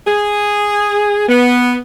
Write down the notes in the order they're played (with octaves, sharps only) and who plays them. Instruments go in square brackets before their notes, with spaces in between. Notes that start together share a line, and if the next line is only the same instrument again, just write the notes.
[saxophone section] G#4
B3